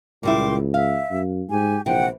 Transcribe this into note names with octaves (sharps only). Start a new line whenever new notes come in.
C#2 A#2 G3 E4 G5 C6 D6
E5 F5
F#2
G#2 G4 G#5
A#1 C3 E3 F#5 G5